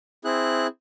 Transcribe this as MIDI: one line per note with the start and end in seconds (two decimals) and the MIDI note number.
0.25 0.67 60
0.25 0.67 64
0.25 0.67 68
0.25 0.67 90